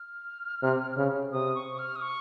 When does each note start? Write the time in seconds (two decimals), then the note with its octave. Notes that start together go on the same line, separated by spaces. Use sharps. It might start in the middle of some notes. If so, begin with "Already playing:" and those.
Already playing: F6
0.63 C3
0.97 C#3
1.32 C3 D#6
1.55 C#6
1.78 F6
1.96 D#6
2.02 C#6